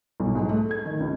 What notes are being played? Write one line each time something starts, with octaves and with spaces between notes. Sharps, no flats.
B1
G#2
A3
G#6
D#3
C#2